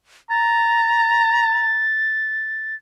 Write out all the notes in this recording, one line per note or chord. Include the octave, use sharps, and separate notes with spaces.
A#5 A6